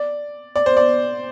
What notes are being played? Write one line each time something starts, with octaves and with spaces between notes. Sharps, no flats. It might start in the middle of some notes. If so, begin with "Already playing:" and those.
Already playing: D5
D5
C5
D5